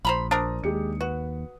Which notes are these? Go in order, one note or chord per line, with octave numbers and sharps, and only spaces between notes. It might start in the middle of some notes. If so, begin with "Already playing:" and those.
A#1 C5 A#5 B5
D4 A#4 C5 A#5 D#6
D#2 G#3 G4 C#7
F#4 B4